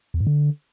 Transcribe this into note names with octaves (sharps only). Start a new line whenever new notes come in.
E2
G#2
D3